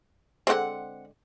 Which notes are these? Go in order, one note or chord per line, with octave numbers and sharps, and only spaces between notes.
D3 D#3 G#3 C4 F#5